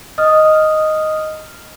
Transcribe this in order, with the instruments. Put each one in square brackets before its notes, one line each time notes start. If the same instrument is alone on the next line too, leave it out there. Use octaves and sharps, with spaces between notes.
[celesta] D#5 D#6 F6